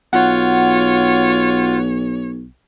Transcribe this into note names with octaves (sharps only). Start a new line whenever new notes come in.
B1 F4 C#5 F#5